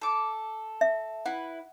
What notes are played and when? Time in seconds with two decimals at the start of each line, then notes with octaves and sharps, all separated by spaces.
0.02 A4 D6
0.81 E5
1.26 E4 B4 F#5